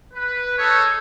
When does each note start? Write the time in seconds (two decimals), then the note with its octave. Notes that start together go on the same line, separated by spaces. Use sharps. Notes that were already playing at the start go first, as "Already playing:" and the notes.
0.14 B4
0.58 D#4 G#4 A4 C#5